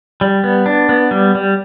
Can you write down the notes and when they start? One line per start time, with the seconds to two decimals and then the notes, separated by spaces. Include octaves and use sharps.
0.21 G3
0.44 B3
0.66 D4
0.89 B3
1.11 G3
1.35 G3